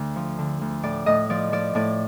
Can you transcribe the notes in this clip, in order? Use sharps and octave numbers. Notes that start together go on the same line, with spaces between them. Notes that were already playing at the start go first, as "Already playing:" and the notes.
Already playing: D2 D3
F3
D3
D2
A2 D5
A2 D#5
F3 D5
F3 D5
A2 D5